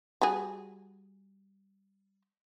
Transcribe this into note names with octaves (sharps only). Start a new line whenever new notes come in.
G3 F#4 G#4